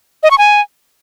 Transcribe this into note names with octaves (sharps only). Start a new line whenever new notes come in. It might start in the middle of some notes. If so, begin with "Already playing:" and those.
D#5
C#6
G#5